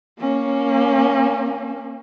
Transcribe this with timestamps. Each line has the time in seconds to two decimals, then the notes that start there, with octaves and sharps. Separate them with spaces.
0.19 A#3 C#4